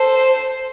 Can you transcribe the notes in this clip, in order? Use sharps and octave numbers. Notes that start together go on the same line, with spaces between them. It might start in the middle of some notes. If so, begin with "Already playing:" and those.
Already playing: A4 C5